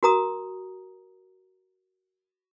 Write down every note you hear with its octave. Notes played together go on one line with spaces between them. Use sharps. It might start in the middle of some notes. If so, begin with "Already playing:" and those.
F#4 A#4 A#5 D#6